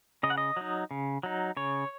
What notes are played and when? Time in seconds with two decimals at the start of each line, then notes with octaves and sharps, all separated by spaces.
0.23 C#3 D#5
0.30 F#5
0.38 D#5
0.56 F#3 D#4
0.91 C#3
1.23 F#3 D#4
1.57 C#3 C#5